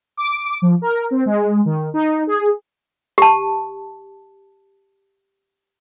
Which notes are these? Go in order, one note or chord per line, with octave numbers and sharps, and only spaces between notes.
D6
F3
A#4
C4
G#3
D#3
D#4
G#4
G4 A5